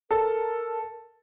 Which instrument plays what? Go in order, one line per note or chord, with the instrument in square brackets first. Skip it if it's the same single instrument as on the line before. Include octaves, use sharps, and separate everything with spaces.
[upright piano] A4 [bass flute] A#4